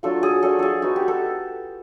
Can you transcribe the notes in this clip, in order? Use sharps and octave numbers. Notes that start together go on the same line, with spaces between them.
F#3 A3 D4 F4 A4
G#4
F#3 A3 D4 F4 A4
G#4 A4
G#3 B3 D#4 F#4
G4
A4